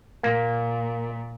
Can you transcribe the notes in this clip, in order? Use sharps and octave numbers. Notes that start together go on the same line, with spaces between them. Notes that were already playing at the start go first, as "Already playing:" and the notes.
A#2 A#3